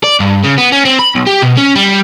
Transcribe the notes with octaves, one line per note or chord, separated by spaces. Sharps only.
D5
G2
C#3
B3
C#4
C4
B5
B1
G4
B2
C#4
G3